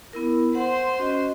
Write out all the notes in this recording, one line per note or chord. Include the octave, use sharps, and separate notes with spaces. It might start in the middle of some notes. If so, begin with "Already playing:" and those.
B3 E4 A#4
C5 F#5 C6
C#4 F#4 D#5